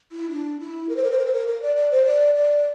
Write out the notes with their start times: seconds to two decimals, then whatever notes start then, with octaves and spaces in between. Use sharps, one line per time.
0.12 E4
0.31 D4
0.60 E4
0.89 A#4
0.97 C5
1.04 A#4
1.11 C5
1.19 A#4
1.26 C5
1.34 A#4
1.47 A#4
1.62 D5
1.76 D5
1.91 C5
2.06 D5
2.35 D5